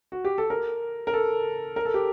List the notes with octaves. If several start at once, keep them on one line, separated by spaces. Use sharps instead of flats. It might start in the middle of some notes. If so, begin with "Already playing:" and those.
F#4
G4
A4
A#4
A#4
A4
A#4
A4
G4